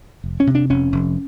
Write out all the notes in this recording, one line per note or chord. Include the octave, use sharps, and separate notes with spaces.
F1
C#4
C3
D4
F1 C#4
F1